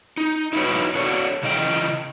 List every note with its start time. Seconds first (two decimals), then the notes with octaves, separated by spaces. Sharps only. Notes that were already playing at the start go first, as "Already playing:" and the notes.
0.17 D#4
0.53 D#4 E4 F#4 B4 C#5
0.95 D4 F#4 A4 C#5
1.43 C#3 E3 D#5 G5